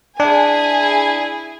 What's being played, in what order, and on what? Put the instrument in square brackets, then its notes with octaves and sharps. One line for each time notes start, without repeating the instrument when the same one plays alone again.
[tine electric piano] D4 [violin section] E4 G#4 G#5